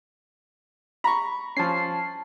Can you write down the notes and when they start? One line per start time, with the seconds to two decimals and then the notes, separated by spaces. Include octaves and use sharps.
1.04 A#5 B5 C#6
1.57 F3 C#4 A5 C7